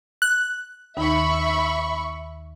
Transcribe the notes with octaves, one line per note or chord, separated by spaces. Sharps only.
F#6
D#2 D#3 D#4 E5 B5 C#6